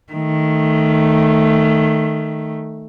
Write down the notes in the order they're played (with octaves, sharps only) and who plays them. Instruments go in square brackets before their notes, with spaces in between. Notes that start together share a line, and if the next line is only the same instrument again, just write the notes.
[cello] D#3 A3